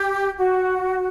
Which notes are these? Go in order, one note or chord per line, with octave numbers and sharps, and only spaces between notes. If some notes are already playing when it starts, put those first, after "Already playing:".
Already playing: G4
F#4